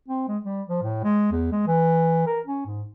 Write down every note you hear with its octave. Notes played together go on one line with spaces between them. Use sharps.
C4
G#3
G3
F3
A2
G#3
E2
G#3
E3
A#4
C#4
G#2